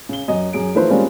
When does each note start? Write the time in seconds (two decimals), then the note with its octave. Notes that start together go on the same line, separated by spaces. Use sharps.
0.09 C#3 G7
0.28 F#2 D#5
0.53 F#2 G#4 D7
0.74 E3 F3 A3 D#4 B4 C5
0.90 G3 G#3 A#3 C4 C#4 F4